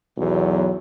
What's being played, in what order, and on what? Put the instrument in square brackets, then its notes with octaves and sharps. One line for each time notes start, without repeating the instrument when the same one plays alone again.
[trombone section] B1 E2 F#3